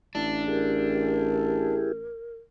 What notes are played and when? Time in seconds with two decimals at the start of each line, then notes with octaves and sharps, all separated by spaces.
0.15 A1 D4 E4
0.48 E4 G4 G#4 A#4